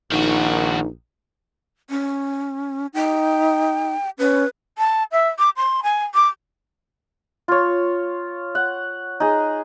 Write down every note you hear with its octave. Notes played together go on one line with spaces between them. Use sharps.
A#1 D#3 D#4 F#4
C#4
D#4 G5
C#4 B4
A5
E5
D6
C6
G#5
D6
F4 C#5
F#5
D#4 G#4